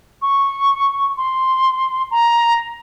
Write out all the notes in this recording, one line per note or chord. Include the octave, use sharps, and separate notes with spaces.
C#6
C6
A#5